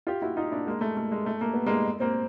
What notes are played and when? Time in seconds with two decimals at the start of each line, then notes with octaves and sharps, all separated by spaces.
0.07 F4 G4
0.22 E4 F#4
0.37 D#4 F4
0.51 D4 E4
0.67 G#3 A#3
0.81 A3
0.97 A3
1.12 G#3
1.26 A3
1.41 A#3
1.53 B3
1.66 G#3 A#3
2.00 A#3 C4